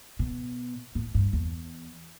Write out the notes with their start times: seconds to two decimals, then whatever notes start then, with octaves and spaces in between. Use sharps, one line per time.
0.19 B2
0.95 A2
1.14 G2
1.33 E2